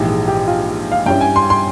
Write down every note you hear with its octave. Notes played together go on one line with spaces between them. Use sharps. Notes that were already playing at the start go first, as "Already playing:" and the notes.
Already playing: A#1 G#2 E3 G4
G#4
G4
F4
F5
G2 G3 C#4 E4 G5
G#5
C6
C6